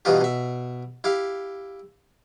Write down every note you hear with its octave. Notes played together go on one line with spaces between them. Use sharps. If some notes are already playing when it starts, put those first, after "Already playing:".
G2 B2 E3 D#4 F4 G4
B2 E5
E4 G4 F5